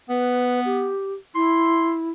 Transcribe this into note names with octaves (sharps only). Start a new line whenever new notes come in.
B3 B4
G4
E4 C6